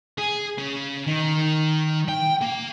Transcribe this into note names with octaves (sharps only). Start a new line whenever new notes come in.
G#4
C#3
D#3
G5
A#3